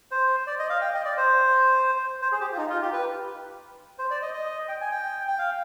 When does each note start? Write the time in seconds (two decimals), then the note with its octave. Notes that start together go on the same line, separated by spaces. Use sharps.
0.11 C5
0.47 D5
0.59 D#5
0.70 F5
0.81 G5
0.94 D#5
1.05 D5
1.17 C5
2.22 C5
2.32 G#4
2.40 G4
2.52 F4
2.57 D#4
2.69 F4
2.82 G4
2.93 B4
3.99 C5
4.10 D5
4.22 D#5
4.33 D#5
4.68 G5
4.81 G#5
4.92 G5
5.28 G5
5.38 F5